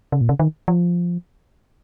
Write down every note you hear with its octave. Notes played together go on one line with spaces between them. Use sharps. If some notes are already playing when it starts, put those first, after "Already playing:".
C#3
A#2
C#3
D#3
F3